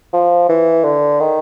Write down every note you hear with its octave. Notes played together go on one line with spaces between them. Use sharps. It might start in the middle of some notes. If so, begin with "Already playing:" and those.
F3
E3
D3
D#3